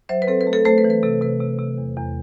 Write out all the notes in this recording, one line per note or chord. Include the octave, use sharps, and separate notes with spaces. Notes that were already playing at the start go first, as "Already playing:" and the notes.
F#3 C5 E5
B4
C4 A4 C5
B4
A3
A4
A3 A4 C5
B4
E3
B4
C3 A4
C3 B4
C3
C3
E2
E2